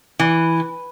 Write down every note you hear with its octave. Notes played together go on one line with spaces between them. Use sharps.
E3